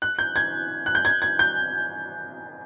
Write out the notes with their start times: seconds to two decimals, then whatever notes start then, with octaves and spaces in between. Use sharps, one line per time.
0.02 F#6
0.19 G6
0.36 G#6
0.86 F#6
0.95 G6
1.05 G#6
1.22 G#6
1.39 G6